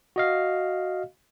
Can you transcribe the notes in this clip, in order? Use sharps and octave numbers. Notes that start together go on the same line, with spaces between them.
F#4 D#5 F5